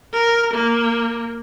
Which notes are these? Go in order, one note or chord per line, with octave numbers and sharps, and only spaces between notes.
A#4
A#3